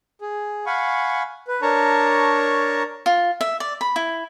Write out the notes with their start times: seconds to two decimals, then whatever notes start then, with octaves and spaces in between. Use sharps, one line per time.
0.21 G#4
0.66 F5 F#5 G#5 B5 C#6
1.48 B4
1.62 D4 A#4 C#5 A5 A#5 C#6
3.06 F4
3.41 E5
3.60 D5
3.81 B5
3.96 E4